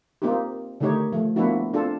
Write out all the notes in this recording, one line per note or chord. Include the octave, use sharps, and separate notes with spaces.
A#3 C4 D#4 F4 G4
D3 D#3 A3 D#4 G4 C#5
F3 A3
F3 A#3 B3 D4 E4 F#4
C4 D4 F4 A4